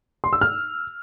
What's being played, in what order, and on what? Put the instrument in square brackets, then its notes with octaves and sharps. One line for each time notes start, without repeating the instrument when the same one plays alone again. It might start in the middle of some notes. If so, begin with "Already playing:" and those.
[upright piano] C6
E6
F6